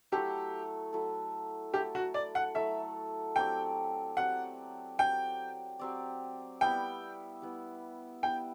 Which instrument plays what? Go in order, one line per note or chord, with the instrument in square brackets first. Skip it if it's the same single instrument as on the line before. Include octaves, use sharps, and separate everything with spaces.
[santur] F#3 A3 E4 A4 [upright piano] G4
[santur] F#3 A3 E4 A4
[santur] F#3 A3 E4 A4 [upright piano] G4
[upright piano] F#4
D5
F#5
[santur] F#3 A3 E4 A4 [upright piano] E5
[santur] F#3 C4 G4 D5 [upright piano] G5
[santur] F#3 C4 G4 D5 [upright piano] F#5
[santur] F#3 C4 G4 D5 [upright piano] G5
[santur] F#3 C4 G4 D5
[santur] G3 B3 E4 [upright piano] G5
[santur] G3 B3 E4
[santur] G3 B3 E4 [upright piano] G5